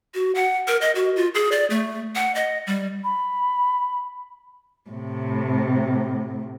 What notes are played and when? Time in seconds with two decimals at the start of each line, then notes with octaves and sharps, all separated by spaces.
0.14 F#4
0.35 F#5
0.68 A#4
0.81 D#5
0.95 F#4
1.16 F4
1.35 G#4
1.52 D5
1.70 A3
2.15 F#5
2.35 D#5
2.67 G3
3.04 B5
4.90 A2 C3